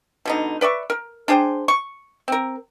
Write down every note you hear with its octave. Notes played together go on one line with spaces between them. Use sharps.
B2 D3 D#4
B4 D5 E5 C#6
A#4
D4 G#4 C5 G5
C#6
C4 A#4